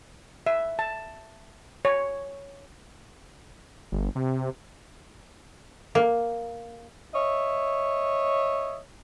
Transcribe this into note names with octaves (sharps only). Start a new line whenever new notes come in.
E5
A5
C#5
G1
C3
A#3
C#5 D#5 E5